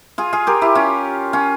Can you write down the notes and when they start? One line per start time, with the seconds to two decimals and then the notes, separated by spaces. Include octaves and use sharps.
0.18 F4 G#4
0.33 F4 G#4
0.47 G4 A#4
0.62 E4 G4
0.75 C#4 F4
1.33 C#4 F4